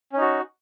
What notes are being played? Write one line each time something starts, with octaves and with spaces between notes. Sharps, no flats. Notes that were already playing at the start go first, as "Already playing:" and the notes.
C#4 D#4 F#4